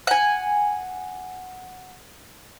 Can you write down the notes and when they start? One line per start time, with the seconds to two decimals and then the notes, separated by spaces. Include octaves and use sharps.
0.07 F#5 G#5